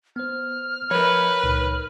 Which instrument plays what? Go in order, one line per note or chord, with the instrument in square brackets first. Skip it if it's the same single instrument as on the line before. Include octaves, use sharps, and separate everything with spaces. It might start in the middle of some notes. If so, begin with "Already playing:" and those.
[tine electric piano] B3 C5 [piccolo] F6
[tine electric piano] F3 [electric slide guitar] A#4 C#5 [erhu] B4
[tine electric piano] C#2 A#2 D#4